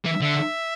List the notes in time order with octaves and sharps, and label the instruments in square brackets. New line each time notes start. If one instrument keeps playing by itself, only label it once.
[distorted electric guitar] E3 [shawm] E5
[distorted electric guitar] D3 [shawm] E5